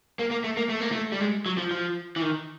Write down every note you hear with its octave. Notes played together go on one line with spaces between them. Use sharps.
A#3
A#3
A3
A#3
A3
A#3
A3
G3
G#3
F#3
F3
F3
E3
D#3